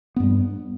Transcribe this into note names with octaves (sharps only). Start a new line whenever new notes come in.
G2 G3 B3